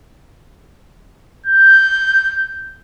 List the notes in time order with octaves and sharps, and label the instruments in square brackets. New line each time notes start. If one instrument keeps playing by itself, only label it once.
[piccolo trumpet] G6